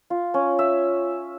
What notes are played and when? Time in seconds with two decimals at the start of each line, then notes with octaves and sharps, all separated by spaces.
0.10 F4
0.34 C#4
0.59 E5